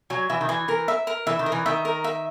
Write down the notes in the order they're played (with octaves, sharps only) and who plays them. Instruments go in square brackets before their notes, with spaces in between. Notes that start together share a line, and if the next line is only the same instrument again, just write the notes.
[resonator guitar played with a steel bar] F#3 [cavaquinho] G#5
[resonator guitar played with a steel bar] E3 [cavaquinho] E5
[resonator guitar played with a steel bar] D#3
[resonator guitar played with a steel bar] E3 [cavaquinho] G#5
[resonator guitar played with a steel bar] E3 [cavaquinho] A#4
[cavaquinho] E5
A#4
[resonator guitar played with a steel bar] E3 [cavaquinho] E5
[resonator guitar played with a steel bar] D#3
[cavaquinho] A#4
[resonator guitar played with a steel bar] E3
[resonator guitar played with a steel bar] D#3 [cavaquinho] E5
[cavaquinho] A#4
E5